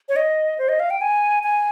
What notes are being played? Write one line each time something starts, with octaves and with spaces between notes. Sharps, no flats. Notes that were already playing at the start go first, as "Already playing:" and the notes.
C#5
D#5
C5
D#5
F5
G5
G#5
G#5